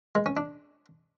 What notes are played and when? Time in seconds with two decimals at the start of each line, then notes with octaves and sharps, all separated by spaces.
0.15 G#3
0.26 C#4
0.37 D4